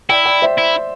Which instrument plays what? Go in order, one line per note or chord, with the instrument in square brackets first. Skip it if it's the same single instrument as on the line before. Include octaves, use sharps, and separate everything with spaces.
[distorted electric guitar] E4 [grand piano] D5 G5
[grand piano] D5 G5
C5 E5
[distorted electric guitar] E4